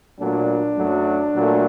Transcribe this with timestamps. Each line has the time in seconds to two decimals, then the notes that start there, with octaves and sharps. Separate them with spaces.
0.19 A#2 F#3 A3 D4
0.76 F#2 F#3 A3
1.35 A#2 F#3 A3